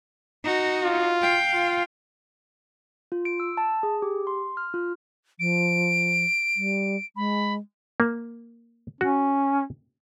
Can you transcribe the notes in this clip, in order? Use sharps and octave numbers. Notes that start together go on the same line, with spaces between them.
D#4 F#4
F4
F5 G5
F4
F4
D7
E6
A5
G#4
G4
C6
F6
F4
F3 D7
G3
G#3 B5
A#3
C#4 F#4